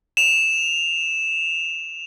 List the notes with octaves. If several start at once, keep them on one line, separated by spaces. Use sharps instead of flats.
E7 F7